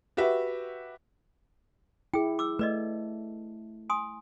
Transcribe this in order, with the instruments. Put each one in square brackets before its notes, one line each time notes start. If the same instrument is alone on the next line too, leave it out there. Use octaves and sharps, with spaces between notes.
[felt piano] F#4 G4 B4 E5
[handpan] E4 [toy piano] G#4 G5
[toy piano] D6 E6
[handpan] A3 [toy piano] B4 D5 D#5
[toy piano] G#5 C6 D#6